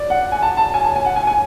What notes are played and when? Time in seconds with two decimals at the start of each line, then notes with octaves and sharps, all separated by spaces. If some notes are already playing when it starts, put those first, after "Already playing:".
Already playing: D5
0.10 F#5
0.32 G#5
0.42 A5
0.57 A5
0.74 G#5
0.84 A5
0.96 G#5
1.05 F#5
1.16 G#5
1.27 G#5